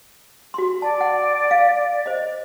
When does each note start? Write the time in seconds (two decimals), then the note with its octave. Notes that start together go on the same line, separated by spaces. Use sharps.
0.54 F#4 C6
0.82 D5 A5
1.01 F#5
1.51 F5
2.06 C5 D#5